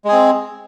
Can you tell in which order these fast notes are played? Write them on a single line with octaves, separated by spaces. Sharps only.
G#3 G#4 C4